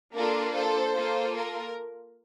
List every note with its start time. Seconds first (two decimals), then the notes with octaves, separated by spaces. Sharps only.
0.14 A#3 D4 F4 A4 A#4
0.54 A4 C5
0.95 A#3 F4 A4
1.35 A#4